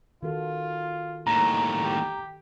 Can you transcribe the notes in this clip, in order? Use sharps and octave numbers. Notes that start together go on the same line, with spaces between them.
D#3 F4 F#4 A4
D#2 A2 A#5
G4